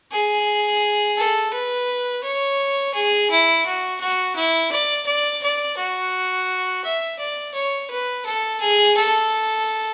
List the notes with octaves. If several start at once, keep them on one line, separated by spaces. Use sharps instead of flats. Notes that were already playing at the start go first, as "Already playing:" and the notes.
G#4
A4
B4
C#5
G#4
E4
F#4
F#4
E4
D5
D5
D5
F#4
E5
D5
C#5
B4
A4
G#4
A4